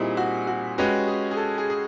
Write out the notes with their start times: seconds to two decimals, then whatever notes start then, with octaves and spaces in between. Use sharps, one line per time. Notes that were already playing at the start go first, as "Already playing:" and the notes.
Already playing: A#2 G3 C4 D#4 E4 G#4
0.17 F#4
0.47 F#4
0.78 G#3 C#4 F#4 G4 B4
1.07 G#4
1.31 G#4
1.37 A4
1.58 G#4
1.70 G#4